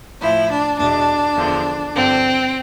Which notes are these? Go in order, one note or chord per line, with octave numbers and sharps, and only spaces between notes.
A2 F3 E4
D4
E2 B2 D4
E2 D3 F3
G2 D3 F3 C4